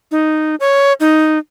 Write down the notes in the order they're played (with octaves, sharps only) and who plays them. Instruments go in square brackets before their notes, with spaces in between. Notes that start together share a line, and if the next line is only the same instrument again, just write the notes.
[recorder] D#4
C#5
D#4